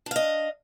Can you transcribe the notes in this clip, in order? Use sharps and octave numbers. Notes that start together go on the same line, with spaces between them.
D4 D#5 F5